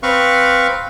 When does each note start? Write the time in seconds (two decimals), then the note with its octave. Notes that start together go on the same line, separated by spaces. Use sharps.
0.03 C4 B4 F5 C#6